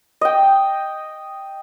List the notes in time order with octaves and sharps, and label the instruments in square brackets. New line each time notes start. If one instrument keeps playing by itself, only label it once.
[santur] D#5 G5